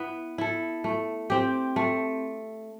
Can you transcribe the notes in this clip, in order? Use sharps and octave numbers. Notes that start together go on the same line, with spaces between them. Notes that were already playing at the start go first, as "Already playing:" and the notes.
Already playing: B3 E4
E4 A4
A3
C4 G4
A3